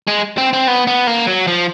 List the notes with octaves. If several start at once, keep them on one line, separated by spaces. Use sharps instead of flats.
G#3
C4
C4
B3
B3
A#3
F#3
F3